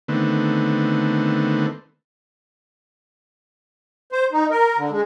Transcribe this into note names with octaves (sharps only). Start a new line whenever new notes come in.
D3 D#3 A3 B3 C4
C5
D#4
A#4
D3
G#3